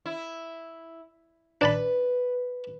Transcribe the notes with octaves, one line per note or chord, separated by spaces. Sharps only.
E4
D4 B4 A5 B5